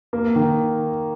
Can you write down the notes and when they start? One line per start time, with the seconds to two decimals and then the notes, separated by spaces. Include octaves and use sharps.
0.13 A#3
0.36 D#3